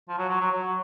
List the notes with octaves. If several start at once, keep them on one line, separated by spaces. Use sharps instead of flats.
F3
F#3
F#3
F#3
F#3